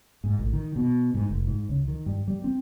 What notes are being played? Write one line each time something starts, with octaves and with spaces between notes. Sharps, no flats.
G#2
A1
D#3
B2
G#2
F1
G#2
C#2
D#3
G2
G3
C4